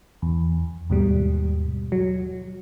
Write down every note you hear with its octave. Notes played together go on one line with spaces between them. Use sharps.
E2
D#2 G#2 B2 G3
F#3